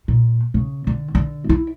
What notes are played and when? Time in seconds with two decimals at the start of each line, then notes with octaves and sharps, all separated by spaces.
0.08 A#2
0.54 C#3
0.87 D3
1.15 D3
1.49 E4